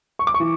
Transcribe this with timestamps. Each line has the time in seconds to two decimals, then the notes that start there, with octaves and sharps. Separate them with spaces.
0.19 C#6
0.27 D6
0.34 C#6
0.40 E3